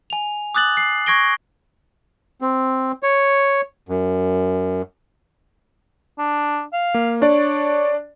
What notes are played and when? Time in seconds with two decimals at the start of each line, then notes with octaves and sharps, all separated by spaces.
0.10 G#5 F7
0.55 D6 D#6 F#6 A6 F#7
0.77 C7
1.06 C#6 G#6 A#6 D7 G7
2.41 C4
3.03 C#5
3.89 F#2
6.19 D4
6.73 F5
6.94 A#3
7.22 D4 C#5 D5